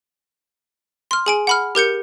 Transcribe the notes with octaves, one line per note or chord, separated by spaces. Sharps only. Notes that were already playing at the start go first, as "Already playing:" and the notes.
C6 F6
G#4 G#5 D7
F#5 B5 F6
G4 A#4 G6 C#7